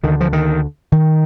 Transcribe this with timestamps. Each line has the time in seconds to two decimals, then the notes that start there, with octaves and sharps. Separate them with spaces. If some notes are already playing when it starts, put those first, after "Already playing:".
0.03 D2 D3 D#3
0.21 F3
0.33 D#3
0.92 D#3